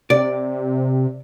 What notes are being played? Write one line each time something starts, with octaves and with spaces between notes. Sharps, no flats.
C3 D5